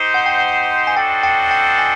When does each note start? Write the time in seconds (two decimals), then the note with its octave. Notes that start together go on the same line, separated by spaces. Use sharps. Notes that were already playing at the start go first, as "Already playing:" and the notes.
Already playing: D#4 G4 C5
0.14 F#5
0.26 G5
0.38 F#5
0.87 G#5
0.96 D4 F#4 A4 C5 D#5 G5
1.23 G5
1.51 G5
1.78 G#5